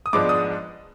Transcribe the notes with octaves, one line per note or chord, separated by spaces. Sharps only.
D#6
G#2 F3 G#3 B3 D4 D6
D#6